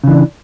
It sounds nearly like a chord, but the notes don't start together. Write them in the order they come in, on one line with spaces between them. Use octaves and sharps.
C#3 E3 D4